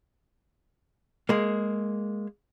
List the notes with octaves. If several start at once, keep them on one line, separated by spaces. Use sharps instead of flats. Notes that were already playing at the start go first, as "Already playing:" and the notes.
G#3 A#3